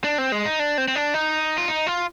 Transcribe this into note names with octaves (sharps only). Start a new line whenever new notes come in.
D4
C4
G#3
D#4
D4
C4
C4
D4
D#4
F4
D#4
F4